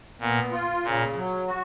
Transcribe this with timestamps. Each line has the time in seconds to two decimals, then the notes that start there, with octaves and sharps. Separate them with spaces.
0.20 A#2 B3
0.51 F4
0.84 A#2 C#3
1.15 F#3
1.47 F#4